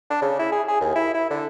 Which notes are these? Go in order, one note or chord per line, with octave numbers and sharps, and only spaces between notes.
D4
C#3
E4
G#4
G#4
D#2
E4
E4
D3